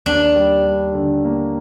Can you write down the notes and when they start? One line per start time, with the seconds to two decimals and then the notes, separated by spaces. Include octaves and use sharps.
0.06 D#2 D4
0.35 G3
0.65 G3
0.94 D3
1.24 A#3